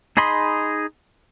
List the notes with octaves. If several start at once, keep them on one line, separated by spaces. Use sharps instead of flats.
D#4 G#4 D#5 B5 C6